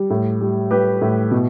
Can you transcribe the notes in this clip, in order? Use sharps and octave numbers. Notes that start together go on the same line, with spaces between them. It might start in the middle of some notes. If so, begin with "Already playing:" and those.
Already playing: G3
A2
G3
G3 G4 B4
A2
B2